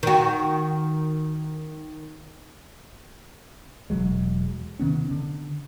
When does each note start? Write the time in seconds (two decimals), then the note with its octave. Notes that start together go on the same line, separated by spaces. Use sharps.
0.03 D#3 F#4
3.90 E1 E2 F#3 G#3
4.79 C3 D#3 B3 C#4
5.11 D3